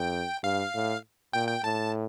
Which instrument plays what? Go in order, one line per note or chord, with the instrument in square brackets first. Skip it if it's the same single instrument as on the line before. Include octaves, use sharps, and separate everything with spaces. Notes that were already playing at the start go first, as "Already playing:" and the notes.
Already playing: [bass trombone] F2 [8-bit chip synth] G5
[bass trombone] G2 [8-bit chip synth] F5
[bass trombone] A2
[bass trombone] A#2 [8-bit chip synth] G5
[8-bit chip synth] G5
[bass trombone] A2 [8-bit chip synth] A5